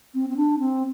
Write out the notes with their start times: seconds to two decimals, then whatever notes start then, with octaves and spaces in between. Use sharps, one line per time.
0.14 C4
0.29 C4
0.37 D4
0.59 C4